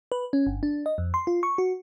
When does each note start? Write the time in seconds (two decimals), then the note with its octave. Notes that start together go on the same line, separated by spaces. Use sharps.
0.12 B4
0.33 C#4
0.47 G1
0.63 D4
0.86 D#5
0.98 F2
1.14 C6
1.27 F4
1.43 C#6
1.58 F#4